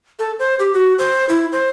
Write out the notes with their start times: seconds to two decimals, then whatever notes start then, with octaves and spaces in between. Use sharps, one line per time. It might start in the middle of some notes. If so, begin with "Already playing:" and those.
0.19 A4
0.39 C5
0.60 G4
0.74 F#4
0.99 C5
1.29 E4
1.52 C5